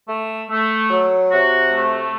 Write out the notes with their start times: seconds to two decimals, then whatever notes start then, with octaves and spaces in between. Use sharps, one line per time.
0.09 A3
0.50 A3
0.90 F#3
1.31 C3 F#4
1.72 A3